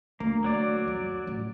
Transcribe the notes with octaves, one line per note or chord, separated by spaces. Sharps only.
D2 A#3
F#3 D5
F#2
A1